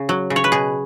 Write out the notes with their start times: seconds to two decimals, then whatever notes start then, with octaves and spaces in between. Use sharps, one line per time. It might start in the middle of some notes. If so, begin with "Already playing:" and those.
Already playing: C#3
0.09 F#3
0.30 C#3
0.36 C#5
0.44 B4
0.52 B2 G#4